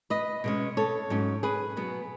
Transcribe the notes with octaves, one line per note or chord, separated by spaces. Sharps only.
B4 D#5
B2 G#3 C#4
A4 C#5
G#2 F#3 C#4
G#4 B4
B2 F#3 B3